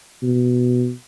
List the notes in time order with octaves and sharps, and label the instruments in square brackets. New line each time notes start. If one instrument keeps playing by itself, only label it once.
[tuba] B2